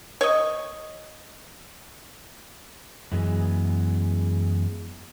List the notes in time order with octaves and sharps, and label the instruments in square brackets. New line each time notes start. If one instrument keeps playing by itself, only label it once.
[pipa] C#5 D#5
[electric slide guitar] F#2 E3 G#3 B3